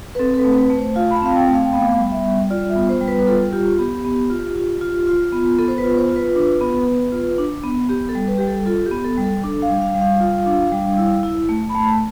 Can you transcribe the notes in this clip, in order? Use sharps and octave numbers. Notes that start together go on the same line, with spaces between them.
B4
C4 A4
A4
B4
A3
B4
A3
C5
F4 F5
B5
A5
C4 F5
G5
A3
F5
G5
B3 F5
G3
E5
G3
F4 D5
E5
B3
C5
G3
B4
B4
F4 A4
F4 G4
B3 G4
B3
F4
F4
F4
F4
B3
B3 A4
C5
B4
F4
C5
F4
B4
D4
B3
B3
F4
D4
B3
B3 G4
A4
G3
B4
G3 G4
A4
F4 A4
G4
B3
A4
G3
A4
D4 A4
F5
G3
F5
G3
F5
F4
D4
G3
E4
E4
A3
B5
A3 A5